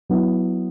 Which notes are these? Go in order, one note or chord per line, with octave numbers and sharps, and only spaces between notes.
F#3 B3 E4